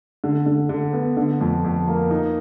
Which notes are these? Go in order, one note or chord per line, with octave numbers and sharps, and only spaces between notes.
D3
D3
D3
B3
D3
F2
F2
A#3
D#4